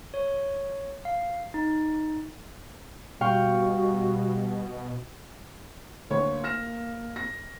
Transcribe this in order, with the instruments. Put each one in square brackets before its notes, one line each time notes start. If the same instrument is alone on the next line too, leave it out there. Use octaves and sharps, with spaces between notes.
[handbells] C#5
F5
D#4
[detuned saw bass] B2 [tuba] G3 [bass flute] F#4 [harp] F5 G5 C#6
[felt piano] D2 C#5 [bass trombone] A#3
[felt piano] F6 A#6 E7
A#6